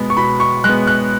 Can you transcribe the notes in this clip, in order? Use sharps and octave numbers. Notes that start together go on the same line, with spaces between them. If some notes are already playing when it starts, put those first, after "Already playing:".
Already playing: B2 G#3 B3
C#6
B2 B5
C#6
G#3 F#6
B3
F#6